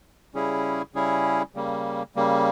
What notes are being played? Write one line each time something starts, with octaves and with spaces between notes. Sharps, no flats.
C#3 G3 C#4 E4 G#4
C#3 G3 C#4 E4 G#4
C#3 G3 A#3
C#3 G3 A#3